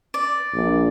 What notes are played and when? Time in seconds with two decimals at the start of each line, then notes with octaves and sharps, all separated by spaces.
0.14 D5
0.54 A#1